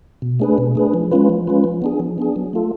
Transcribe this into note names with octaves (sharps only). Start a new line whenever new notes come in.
B2
A3 D4 G#4 B4
B2
A3 D4 G#4 B4
F3
G#3 C#4 F4 B4
F3
G#3 C#4 F4 B4
F3
B3 D4 G#4
F3
B3 D4 G#4
F#3
A3 F4 A4